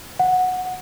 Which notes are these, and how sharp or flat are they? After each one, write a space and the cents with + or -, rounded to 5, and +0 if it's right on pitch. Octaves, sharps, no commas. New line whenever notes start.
F#5 -10